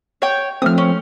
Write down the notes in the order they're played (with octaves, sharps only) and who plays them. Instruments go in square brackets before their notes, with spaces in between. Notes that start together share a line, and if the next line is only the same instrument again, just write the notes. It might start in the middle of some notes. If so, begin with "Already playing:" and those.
[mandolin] C#5 G5
[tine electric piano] F3 A3 C4 [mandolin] D#6 F6
[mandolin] C#4